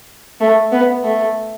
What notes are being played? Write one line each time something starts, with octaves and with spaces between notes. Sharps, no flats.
A3
B3
A3